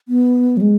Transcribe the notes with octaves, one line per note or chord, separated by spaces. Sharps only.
B3
F#3
G#3